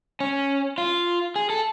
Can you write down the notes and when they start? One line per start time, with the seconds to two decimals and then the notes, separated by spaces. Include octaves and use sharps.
0.20 C#4
0.78 F4
1.36 G#4
1.50 A4